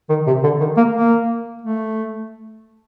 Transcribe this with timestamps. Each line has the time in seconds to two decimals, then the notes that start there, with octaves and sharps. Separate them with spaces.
0.09 D#3
0.27 C3
0.43 D3
0.60 D#3
0.77 A#3
0.94 A#3
1.62 A3